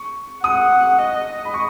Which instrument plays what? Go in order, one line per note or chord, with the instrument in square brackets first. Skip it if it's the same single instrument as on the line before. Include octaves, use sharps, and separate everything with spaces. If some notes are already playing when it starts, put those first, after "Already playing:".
Already playing: [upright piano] C#6
[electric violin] F#5 [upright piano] D#6
[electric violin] D#5
[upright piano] B5
C#6